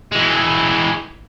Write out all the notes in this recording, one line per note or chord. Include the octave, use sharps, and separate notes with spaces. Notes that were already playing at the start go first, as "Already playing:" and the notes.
E3 G#3